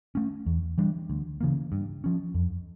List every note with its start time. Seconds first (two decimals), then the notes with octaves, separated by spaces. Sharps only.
0.15 A3 C#4
0.46 E2
0.78 E3 G3 D4
1.10 D2
1.41 C#3 E3 A#3
1.72 G2
2.04 F3 C#4
2.35 F2